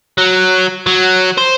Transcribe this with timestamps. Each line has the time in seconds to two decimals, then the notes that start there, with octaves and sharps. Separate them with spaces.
0.18 F#3
0.86 F#3
1.38 C5